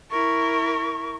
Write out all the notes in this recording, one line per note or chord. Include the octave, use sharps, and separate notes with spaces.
E4 A#4 C#6